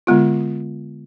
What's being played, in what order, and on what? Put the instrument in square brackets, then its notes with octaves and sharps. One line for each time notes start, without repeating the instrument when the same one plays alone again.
[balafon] D3 G#3 B3 F4